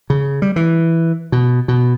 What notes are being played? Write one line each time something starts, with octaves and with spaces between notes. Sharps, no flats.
C#3
G3
E3
B2
B2